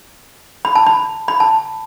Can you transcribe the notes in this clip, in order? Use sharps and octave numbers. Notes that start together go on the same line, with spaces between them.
B5
A5
B5
B5
A5